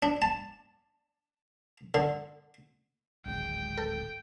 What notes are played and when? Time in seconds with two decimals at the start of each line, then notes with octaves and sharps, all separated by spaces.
0.03 D4
0.22 A5
1.94 D3
3.26 D1 G#1 G#3 G5
3.78 A4